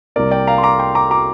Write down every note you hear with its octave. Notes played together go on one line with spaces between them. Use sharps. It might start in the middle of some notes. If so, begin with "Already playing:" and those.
C2 C3 A#3 A#4 D5
D5 G5
F5 A#5
C6
A#5 D6
G5 C6
A#5 D6
A#5 D6